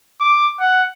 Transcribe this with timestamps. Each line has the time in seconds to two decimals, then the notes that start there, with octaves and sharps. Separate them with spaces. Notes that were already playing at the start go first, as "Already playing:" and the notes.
0.20 D6
0.60 F#5